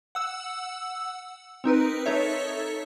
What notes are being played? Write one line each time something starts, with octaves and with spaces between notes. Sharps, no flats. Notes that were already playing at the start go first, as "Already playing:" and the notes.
F#5 E6
C4 D#4 A#4 B4
D#4 A4 C#5 E5